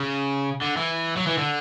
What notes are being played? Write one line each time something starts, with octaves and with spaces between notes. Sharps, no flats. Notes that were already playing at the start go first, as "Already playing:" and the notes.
Already playing: C#3
D3
E3
F#3
E3
D3